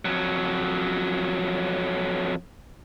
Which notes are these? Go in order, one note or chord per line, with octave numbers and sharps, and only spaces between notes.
F2 F#3